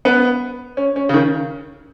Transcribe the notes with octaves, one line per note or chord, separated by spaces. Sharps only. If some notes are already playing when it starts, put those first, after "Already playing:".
B3
C#4
C#4
C#3
D#3